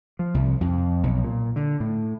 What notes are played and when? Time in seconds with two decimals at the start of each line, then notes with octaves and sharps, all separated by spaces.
0.19 F3
0.34 C2
0.61 F2
1.03 B1
1.24 A#2
1.56 D3
1.80 A2